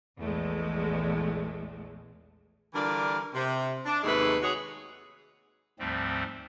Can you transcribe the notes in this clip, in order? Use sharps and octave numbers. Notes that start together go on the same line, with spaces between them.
A#1 E2 G#3 A3
D3 E3 G3 F4 A#4 D5
C3
D4
D#2 G#2 C3 G#3 A3 B4
F#4 G#4 C#5
D2 G#2 F3 G3 A3 C4